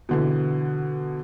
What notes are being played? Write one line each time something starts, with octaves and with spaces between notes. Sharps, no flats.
B2 D3 E3